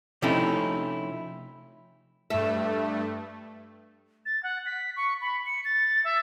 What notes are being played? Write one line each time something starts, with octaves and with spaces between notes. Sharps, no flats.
C3 F3 A3 C#4 D#4 E4
G2 A3 E5
A6
F#5
B6
C#6
B5
C#7
A6
E5